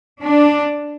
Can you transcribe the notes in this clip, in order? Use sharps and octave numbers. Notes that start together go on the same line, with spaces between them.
D4